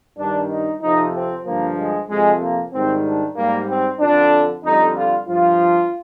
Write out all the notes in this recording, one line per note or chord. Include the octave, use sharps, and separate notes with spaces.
G2 D#3 G3 D4
D#4
F2 C3 F3 D#4
C4
G2 D3 F3 A#3
G#3
F2 C3 F3 G#3
A#3
G#2 D#3 G3 C4
D4
G#2 G3 A#3
C4
F2 D3 F3 D4
F2 D3 G3 D#4
F4
G2 F3 F4